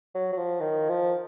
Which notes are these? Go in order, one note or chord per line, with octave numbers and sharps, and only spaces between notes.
F#3
F#3
F3
D#3
F3